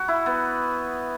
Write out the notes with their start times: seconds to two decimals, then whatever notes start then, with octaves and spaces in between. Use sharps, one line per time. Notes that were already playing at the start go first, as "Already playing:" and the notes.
Already playing: F#4
0.08 E4
0.26 B3